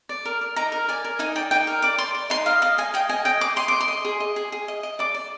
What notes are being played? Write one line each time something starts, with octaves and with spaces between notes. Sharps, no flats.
D5
A#4
A#4
D#4 A#5
A#4
D5 G#5
A#4
D#4 G#5
D5 G5
D#4 G5
A#4
D5 D6
D5 C6
D5
D#4 C6
D#5 F5
D#5 F5
D#5 G#5
D#5 G5
D#5 G#5
D#5 G5
G#4 D6
D#5 C6
D#5 D6
C6
D#5
G#4
D#5
G#4
G#4
D#5
D#5
D5 D6
D5